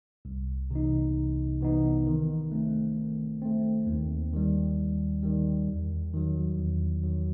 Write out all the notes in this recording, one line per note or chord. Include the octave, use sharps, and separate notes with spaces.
C2
C3 E3 B3 D#4
C2
C3 E3 B3 D#4
D#3
A3 C4
D#3
A3 C4
D#2
D#3 G3
D#2
D#3 G3
E2
D#3 F#3
E2
D#3 F#3